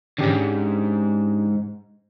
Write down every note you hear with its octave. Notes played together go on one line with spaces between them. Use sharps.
D#2 G#2 C#4 D4 G4